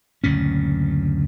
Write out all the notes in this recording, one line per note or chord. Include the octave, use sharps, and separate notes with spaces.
F#1 D2 A#2 C#4